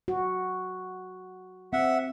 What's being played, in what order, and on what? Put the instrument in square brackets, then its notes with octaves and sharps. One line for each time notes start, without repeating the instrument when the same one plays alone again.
[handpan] F#4
[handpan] C4 [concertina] E5 F#5